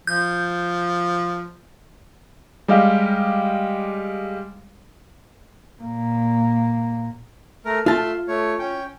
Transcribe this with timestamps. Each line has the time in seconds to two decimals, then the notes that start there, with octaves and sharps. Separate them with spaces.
0.07 F3 G6
2.68 G3 G#3 G4 D#5 F5
5.82 A#2 A#3
7.65 A3 A#4
7.86 A3 F4 E5 A5 C6
8.28 A3 C#5
8.59 C#4 G5